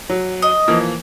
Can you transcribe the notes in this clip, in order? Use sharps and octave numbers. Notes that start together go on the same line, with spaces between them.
F#3
D#5
E3 F3 A#3